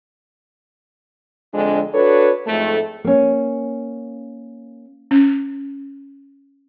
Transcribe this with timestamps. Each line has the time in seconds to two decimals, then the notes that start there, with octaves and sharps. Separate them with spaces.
1.53 F2 D3 G#3 C4 D4
1.94 D4 F#4 A4 B4 C#5
2.47 F2 G#2 A3
3.04 A#3 C#4
5.11 C#4